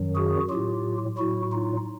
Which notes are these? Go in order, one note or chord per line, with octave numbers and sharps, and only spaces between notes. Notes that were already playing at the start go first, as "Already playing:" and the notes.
Already playing: F#2 D#3 F#3
F#4 G#4
A2 F#3 F4 G4
A2 F#3 E4 F#4
D#4 F4